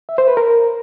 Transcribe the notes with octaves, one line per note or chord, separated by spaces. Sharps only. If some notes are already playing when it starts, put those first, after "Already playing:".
E5
C5
B4
A#4